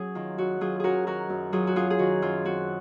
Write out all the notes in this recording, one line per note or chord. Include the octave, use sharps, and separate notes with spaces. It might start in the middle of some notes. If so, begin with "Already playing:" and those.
Already playing: F#3 C#4 G#4
D#3 F4
F#2 F#4
F#3 F4 G#4
C#4 F#4 G#4 A#4
D#3 F#4 A#4
F#2
F#3 F4 G#4
F#4
C#4 F4 G#4
G#4
D#3 F#4
F#2 F4
C4 F#4